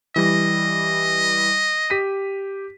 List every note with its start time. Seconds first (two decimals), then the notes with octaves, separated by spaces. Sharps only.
0.16 E3 G3 D#5 A#6
1.90 G4 B6 D#7